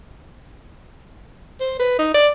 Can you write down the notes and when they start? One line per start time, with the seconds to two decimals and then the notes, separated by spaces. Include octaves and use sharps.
1.60 C5
1.79 B4
1.98 D#4
2.14 D5